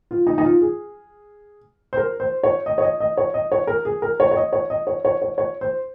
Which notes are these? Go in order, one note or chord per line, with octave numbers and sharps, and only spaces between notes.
F4
D#4
D#4
F4
G#4
C5
A#4
C5
C#5
D#5
C#5
D#5
D#5
C#5
D#5
C#5
A#4
G#4
A#4
C#5
C#5
D#5
C#5
D#5
C#5
C#5
C#5
C#5
C5